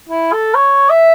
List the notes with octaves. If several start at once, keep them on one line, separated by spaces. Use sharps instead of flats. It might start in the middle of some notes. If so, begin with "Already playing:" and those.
E4
A4
C#5
E5